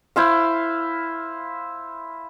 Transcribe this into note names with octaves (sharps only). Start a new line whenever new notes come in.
E4 C5 F5